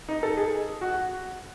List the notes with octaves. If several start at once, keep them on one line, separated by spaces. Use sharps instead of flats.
D#4
A4
G#4
F#4